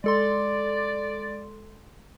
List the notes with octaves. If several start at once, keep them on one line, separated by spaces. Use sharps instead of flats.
G#3 A4 D5 C6